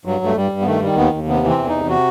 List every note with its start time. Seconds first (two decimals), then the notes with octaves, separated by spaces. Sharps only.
0.05 G2 F#3
0.21 G2 A3
0.36 G2 G3
0.52 G2
0.62 B3
0.66 D#3 A3
0.82 D#3 G3
0.97 D#2 B3
1.13 D#2
1.28 C3 B3
1.43 E3
1.48 C4
1.58 E2
1.69 C3 D#4
1.89 F#4